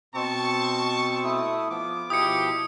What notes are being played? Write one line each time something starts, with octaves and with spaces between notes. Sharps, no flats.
B2 C4 A5 C#6
A3 E4 D#6
F3 B3 D6
B2 F3 E4 G4 D#6 C#7